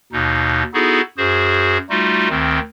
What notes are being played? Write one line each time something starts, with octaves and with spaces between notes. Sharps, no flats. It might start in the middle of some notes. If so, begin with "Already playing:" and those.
D#2 B2 D#4
B3 D#4 E4 F#4 G#4 A4
F#2 F#4 G#4 C5
G3 A3 D#4 F4 F#4
D2 D#3 C4